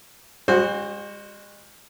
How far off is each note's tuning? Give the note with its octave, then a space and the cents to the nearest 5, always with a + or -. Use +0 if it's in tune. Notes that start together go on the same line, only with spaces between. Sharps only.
G#3 -40 F#4 +0 C5 +20